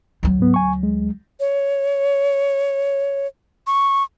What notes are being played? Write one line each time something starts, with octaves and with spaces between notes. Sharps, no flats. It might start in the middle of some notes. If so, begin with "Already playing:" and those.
D2 F#3
G#2 B3
G#5 C#6
G#3
C#5
C#6